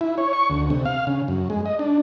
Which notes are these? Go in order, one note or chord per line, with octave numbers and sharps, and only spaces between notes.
E4
C#5
C#6
D2
C3
F5
C#3
F#2
G#3
D#5
D4